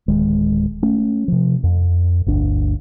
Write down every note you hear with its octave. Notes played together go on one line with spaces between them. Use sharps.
D1 D#3 G#3
A3 C#4
C3 F3
F2
G1 D2 D4